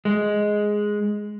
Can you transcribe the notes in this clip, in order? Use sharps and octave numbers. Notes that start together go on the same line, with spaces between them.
G#3